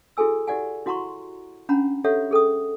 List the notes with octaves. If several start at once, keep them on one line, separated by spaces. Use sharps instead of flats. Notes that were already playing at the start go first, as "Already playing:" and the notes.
E4 F#4 G#4 A4 G#5 E6
E4 G4 D5 F#5 G#5
E4 F#4 F#5 A#5 C6 C#6
C#4 D4 F#5 A#5 B5
G4 A4 C#5 E5 F#5
G#4 A4 G5 D#6